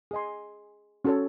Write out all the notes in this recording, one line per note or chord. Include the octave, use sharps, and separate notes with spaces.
G#4 D#5 G#5 C6
C#4 F#4 A4 C#5